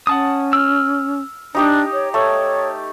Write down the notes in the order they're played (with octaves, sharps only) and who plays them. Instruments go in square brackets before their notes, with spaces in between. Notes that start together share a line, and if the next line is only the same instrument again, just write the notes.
[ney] C#4 [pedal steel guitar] F#5 A5 D#6
[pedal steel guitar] E6 F6
[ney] D4 [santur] D#4 G4 D#5
[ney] C#5
[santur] A3 [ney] C#5